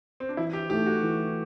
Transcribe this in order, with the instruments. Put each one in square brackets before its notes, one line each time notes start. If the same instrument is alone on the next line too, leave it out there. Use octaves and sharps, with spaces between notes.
[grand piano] C4
D4
[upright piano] E3 [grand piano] E4
[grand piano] G4
[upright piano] A3 E4 A4 [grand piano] G4
[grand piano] F#4
[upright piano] E3